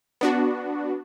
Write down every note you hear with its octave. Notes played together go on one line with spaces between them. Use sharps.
B3 D4 F#4